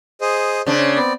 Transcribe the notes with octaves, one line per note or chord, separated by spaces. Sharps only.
G#4 C5 D#5
C#3 D4 C5
B3 C4 D5